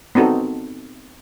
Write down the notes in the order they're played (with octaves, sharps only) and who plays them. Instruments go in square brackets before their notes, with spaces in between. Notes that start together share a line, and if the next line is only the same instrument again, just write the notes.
[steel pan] B3 C4 D#4 F#4 A4